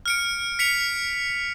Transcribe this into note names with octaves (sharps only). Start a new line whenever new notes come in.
F6 C#7 D7
B6 C#7 F7